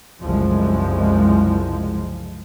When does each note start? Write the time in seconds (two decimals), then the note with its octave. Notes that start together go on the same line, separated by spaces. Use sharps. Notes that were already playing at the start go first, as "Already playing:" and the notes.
0.23 F#1 C2 F3 G#3